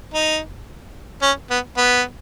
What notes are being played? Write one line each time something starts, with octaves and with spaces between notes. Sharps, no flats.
D#4
C#4
B3
B3